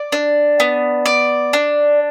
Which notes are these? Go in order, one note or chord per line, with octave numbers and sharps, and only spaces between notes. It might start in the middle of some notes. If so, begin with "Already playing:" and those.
Already playing: D5
D4
B3
D5
D4